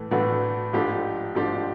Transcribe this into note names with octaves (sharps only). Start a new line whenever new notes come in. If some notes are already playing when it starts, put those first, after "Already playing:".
Already playing: A2 E3 A3
A2 E3 A3 D4 F#4
G#2 F3 A3 D4 G4
G#2 F3 A3 D4 G4